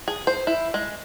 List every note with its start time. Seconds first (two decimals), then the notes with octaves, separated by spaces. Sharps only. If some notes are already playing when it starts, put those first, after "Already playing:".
0.08 G#4
0.27 C5
0.47 E4
0.74 G#3